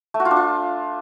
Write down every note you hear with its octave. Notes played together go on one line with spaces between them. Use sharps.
A3
F#4
F4
D4
F4